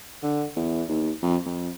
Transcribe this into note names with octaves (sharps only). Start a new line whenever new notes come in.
D3
E2
D#2
F2
F2